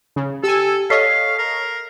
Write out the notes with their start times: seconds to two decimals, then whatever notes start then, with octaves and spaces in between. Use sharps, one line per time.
0.16 C#3
0.44 G4 A4 G#5 E6
0.90 A4 C#5 D#5 F5 B6 C7
1.39 A#4